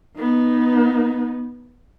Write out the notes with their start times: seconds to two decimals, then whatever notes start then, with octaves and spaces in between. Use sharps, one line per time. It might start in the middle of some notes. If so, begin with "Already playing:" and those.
0.17 B3 D#4